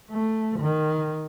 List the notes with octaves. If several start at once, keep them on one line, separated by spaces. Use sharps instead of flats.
A3
D#3